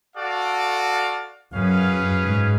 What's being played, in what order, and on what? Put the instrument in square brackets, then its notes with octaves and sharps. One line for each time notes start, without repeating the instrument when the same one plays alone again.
[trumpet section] F#4 A4 D5 F5
[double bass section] F#2 [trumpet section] C#4 G#4 B4 F5
[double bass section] G#2